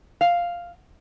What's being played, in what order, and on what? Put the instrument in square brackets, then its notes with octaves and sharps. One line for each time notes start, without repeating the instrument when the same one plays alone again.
[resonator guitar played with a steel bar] F5